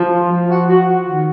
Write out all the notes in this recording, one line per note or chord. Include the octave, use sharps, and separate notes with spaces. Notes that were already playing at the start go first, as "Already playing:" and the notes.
Already playing: F3
F4
F3
F#4
F#4
F#4
D#3